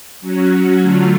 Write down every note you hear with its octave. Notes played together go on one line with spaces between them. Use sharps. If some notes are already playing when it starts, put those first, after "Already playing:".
F#3 C#4 F#4
D3 F#3 A3 F4